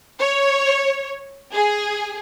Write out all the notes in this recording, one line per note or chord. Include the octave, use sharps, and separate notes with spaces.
C#5
G#4